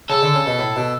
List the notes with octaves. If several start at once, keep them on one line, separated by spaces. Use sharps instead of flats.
C#3 A4
D3
C#3
B2
A2
B2